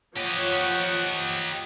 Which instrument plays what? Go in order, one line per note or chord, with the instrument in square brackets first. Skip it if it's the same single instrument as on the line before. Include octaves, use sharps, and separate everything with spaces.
[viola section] F3 C#5 F#5 [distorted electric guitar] G4 D#5